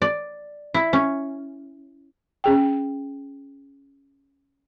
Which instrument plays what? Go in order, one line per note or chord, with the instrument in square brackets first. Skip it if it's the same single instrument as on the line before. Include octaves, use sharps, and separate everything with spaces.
[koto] D5
E4
C#4
[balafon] C#4 G#4 G5